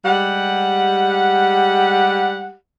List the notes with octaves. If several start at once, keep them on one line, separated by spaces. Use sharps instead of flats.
G3 G#3 G4 F#5